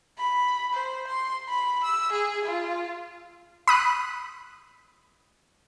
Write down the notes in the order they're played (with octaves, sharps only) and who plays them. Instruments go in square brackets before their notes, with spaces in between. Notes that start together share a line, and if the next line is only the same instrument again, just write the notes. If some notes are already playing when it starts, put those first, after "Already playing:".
[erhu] B5
C5
C6
B5
E6
G#4
F4
[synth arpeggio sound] B5 D#6 F#6